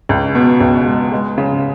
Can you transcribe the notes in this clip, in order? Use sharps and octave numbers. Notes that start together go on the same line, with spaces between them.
C#2
B2
C#2
G#3
G#3
C#3